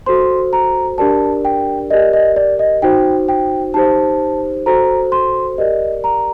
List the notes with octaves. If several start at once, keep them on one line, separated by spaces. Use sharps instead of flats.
F#4 A4 C5 C6
A#5
D4 G4 A#4 D5 A5
G5
G4 A#4 D5 D#5
D#5
D5
D#5
D#4 F#4 C5 G5
G5
D#4 G4 C5 A5
F#4 A4 C5 A#5
C6
G4 A#4 D5 D#5
A#5